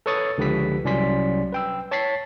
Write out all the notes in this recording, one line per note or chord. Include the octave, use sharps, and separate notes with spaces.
A4 B4 C#5 C#6 D#6 A6
C#2 D3 F3 G4 B4 B6
C2 F#3 C#4 D5 C6 B6
B4 G5 E6
C#5 A5 C#6 A6 B6 C7